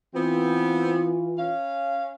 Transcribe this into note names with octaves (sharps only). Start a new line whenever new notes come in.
E3 B3 C4 F4
C#4 F5